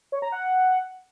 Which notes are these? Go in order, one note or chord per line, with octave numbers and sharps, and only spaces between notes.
C#5
A#5
F#5